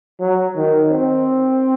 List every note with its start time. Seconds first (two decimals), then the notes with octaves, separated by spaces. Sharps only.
0.20 F#3
0.56 D#3
0.91 C4